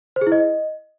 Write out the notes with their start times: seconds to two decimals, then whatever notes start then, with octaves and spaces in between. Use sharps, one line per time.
0.16 C5
0.21 G#4
0.27 E4
0.32 D#5